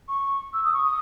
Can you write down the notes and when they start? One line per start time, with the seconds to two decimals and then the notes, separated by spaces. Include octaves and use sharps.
0.08 C#6
0.53 E6
0.64 D#6
0.73 C#6
0.84 D#6